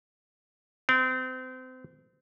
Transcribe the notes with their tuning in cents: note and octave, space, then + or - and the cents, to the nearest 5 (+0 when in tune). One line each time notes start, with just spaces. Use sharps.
C4 -30